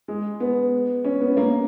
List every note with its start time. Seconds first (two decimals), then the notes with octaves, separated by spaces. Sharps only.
0.08 G#3
0.40 B3
1.04 C#4
1.21 B3
1.37 A#3